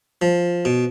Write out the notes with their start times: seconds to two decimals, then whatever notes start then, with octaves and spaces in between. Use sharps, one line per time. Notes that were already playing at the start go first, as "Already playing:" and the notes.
0.22 F3
0.65 B2